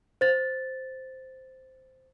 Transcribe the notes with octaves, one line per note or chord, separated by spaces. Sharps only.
C5 A6